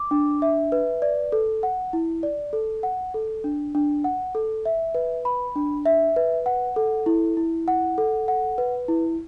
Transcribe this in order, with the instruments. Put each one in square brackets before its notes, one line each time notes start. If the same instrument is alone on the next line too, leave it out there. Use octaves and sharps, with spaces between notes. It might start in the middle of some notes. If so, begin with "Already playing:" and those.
Already playing: [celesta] D6
D4
E5
B4
D5
A4
F#5
E4
D5
A4
F#5
A4
D4
D4
F#5
A4
E5
B4
B5
D4
E5
B4
F#5
A4
E4
E4
F#5
A4
F#5
B4
E4